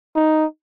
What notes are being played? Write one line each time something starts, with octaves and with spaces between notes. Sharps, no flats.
D#4